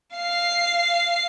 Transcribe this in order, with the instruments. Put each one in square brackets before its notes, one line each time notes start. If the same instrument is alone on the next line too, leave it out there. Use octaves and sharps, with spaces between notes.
[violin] F5 C7